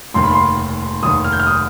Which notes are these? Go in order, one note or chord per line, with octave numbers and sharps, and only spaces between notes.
F1 D#2 D#3 C6
B5
C6
F1 D#2 D#3 D#6
F6
G6
F6
D#6